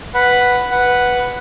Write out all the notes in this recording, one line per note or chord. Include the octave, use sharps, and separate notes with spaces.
B4 F#5 B5
B4 F#5